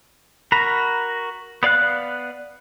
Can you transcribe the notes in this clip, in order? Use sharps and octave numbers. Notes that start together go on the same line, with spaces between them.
F#4 A#4 A#5 B5
B3 D5 F5 F#6